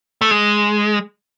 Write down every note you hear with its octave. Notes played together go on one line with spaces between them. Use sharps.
A3
G#3